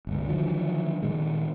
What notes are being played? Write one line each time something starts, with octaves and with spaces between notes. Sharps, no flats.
G1 C#2
D3 D#3 F3 F#3
A#2 D#3 G#3